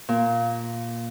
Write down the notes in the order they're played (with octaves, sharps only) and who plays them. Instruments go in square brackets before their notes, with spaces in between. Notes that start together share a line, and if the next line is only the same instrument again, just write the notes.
[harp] A#2